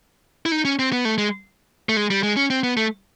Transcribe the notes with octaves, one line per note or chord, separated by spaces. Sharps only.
E4
D#4
C#4
C4
B3
A3
G#3
A3
G#3
G3
G#3
C#4
C4
B3
A3